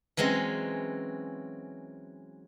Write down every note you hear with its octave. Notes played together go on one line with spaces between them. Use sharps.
E3 F#3 G#3 C4 C#4